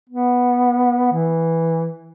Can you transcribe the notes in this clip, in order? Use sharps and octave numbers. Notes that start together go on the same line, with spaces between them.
B3
E3